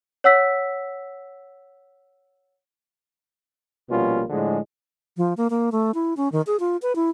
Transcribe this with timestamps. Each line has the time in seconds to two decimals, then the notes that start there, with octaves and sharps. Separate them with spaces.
0.24 C#5 F#5 E6 B6
3.90 A#1 B2 G3 A#3 C#4 F4
4.30 A2 D3 F3 G#3
5.17 F3
5.37 A#3
5.50 A#3
5.72 A3
5.95 E4
6.17 C#4
6.32 D#3
6.47 G#4
6.60 F4
6.82 B4
6.96 E4